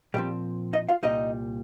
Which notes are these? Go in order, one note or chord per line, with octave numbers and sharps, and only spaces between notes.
A#2 F3 G3 C4 G4
D#4 D#5
F4 F5
C2 A#2 G3 D#4 D#5